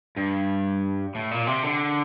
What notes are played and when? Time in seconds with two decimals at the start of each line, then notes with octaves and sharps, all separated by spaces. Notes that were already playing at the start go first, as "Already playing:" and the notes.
0.17 G2
1.15 A2
1.31 A#2
1.47 C3
1.64 D3